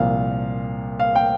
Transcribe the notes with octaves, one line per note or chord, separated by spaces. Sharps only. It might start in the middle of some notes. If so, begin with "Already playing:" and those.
Already playing: C2 A#2 F3 A#3 F5
F5
G5